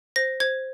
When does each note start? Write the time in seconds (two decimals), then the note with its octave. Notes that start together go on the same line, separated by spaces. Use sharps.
0.16 C5 A#6
0.40 C5 G#6